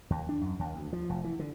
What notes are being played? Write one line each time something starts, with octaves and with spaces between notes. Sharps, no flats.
D#2
D4
F#2
D#2
D2
F3
F1
E3
D3